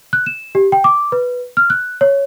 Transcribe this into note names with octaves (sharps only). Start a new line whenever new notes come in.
F#6
E7
G4
G5
D6
B4
F6
F#6
C#5